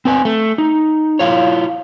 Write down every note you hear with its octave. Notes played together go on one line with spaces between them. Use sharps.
C4 B4 G#5
A3
D#4
E4 F4 C#5